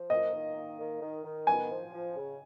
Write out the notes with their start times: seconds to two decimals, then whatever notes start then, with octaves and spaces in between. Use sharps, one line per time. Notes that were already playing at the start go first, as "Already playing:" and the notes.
Already playing: F3
0.09 A#3 D#5
0.33 D#3
0.55 A#3
0.79 D#3
1.01 D#3
1.24 D#3
1.47 B3 G#5
1.70 F3
1.93 F3
2.16 C#3